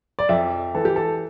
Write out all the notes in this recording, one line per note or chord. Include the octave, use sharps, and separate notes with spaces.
D5
F2 E5
E3 A4
G4
A4